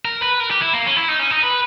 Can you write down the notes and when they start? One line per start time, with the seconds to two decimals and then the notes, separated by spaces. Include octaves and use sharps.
0.05 A#4
0.22 B4
0.40 A#4
0.51 G4
0.62 E4
0.73 A#3
0.86 C#4
0.96 E4
1.08 D#4
1.19 C#4
1.31 D#4
1.43 B4